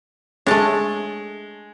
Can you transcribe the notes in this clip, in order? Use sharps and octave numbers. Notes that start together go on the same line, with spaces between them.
G#3 A3 D4 C#5 A5